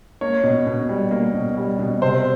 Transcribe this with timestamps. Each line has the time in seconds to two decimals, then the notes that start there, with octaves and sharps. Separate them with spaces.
0.21 A#3 C#5
0.43 B2
0.67 B2
0.89 G3
1.11 A#3
1.34 B2
1.57 G3
1.79 B2
2.02 C3 C5